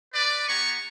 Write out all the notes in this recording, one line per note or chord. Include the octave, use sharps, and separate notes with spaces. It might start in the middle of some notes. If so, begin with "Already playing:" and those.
B4 D5
B3 G4 B4 G#5 A#5 C#6